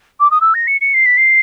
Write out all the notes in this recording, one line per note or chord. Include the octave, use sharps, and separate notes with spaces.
D6
D#6
E6
A#6
C#7
C#7
C7
B6
C7